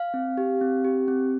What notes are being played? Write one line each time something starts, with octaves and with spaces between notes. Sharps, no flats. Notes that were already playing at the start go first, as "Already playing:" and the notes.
Already playing: F5
C4
G4
C4
G4
C4